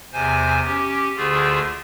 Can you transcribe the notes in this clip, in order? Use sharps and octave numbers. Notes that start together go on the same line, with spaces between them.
E2 C3 C5 G#5
C#4 G4
D2 D3 A3 F4 G#4